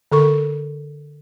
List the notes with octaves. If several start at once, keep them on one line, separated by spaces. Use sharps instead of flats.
D3 A4 C#6